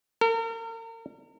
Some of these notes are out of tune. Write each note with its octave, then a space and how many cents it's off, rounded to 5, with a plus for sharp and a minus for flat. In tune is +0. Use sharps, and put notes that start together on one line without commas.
A#4 -40